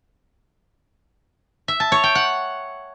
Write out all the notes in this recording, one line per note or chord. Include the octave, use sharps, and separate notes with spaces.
E5
A5
C#5
G5
F#5